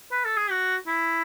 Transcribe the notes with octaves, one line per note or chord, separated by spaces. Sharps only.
B4
A4
G#4
F#4
E4